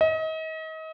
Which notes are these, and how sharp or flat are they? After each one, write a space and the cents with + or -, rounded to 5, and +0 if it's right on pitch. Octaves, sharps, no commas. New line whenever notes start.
D#5 +35